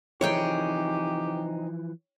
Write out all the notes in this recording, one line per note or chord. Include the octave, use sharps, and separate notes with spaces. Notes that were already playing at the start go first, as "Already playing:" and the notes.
C3 E3 F3 D#4 G4 G#4 C#5 G5